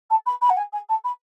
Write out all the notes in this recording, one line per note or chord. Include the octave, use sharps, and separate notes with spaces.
A5
B5
B5
F#5
G#5
G#5
A5
B5